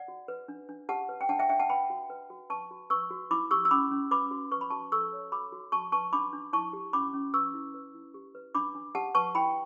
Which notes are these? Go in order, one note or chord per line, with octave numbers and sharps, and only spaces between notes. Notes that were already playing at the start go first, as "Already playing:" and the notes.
Already playing: D5 F#5
F#4
B4
D4
D4
G4 F#5 A5
B4
G5
D4 F#5 A5
E5 G5
D4 E5 G5
F#5 A5
B4 G5 B5
F#4
B4
F#4
B4 A5 C#6
F#4
B4 C#6 E6
F#4
E4 B5 D6
G4 C#6 E6
E6
C#4 B5 D6
C#4
B4 B5 D6
F#4
B4 C#6
B5
F#4 A5 C#6
A4 C#6 E6
C#5
F#4 B5 D6
F#4
F#4 A5 C#6
B4 A5 C#6
D4 B5 D6
D4
E4 A5 C#6
G4
C#4 B5 D6
C#4
B4 C#6 E6
E4
B4
E4
G4
B4
D4 B5 D6
D4
G4 F#5 A5
B4 A5 C#6
E4 G5 B5